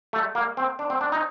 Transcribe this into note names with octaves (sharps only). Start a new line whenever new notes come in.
A3
A#3
C4
D4
C4
D4
D#4